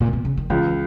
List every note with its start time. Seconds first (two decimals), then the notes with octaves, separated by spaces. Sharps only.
0.00 A#2
0.13 B2
0.25 C#3
0.37 D#3
0.50 C#2 E3